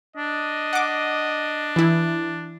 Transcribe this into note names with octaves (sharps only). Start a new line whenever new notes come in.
D4 D#5
F#5 D6
E3 E4